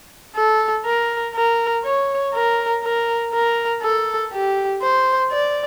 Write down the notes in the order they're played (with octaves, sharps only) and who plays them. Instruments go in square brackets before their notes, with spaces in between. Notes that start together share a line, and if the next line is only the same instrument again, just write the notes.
[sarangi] A4
A#4
A#4
C#5
A#4
A#4
A#4
A4
G4
C5
D5